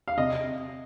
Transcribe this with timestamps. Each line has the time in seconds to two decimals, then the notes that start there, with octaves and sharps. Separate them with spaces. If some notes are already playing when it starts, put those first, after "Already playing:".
0.08 F5
0.17 C3 D#5